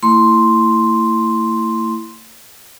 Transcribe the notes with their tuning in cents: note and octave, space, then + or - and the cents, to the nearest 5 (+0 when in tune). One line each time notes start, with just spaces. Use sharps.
A3 +45 E4 +0 C6 +0